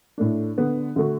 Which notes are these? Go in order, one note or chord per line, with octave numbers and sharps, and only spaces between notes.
A2 A3 D4
D3 B3 D4
D3 A3 F#4